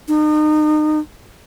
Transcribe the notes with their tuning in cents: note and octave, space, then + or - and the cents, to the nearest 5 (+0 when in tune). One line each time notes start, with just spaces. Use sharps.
D#4 -35